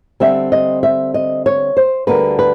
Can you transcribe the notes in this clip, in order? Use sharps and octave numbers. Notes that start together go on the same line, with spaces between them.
D3 G3 C4 E5
D#5
E5
D#5
C#5
C5
D2 D3 G3 A#3 B4
B4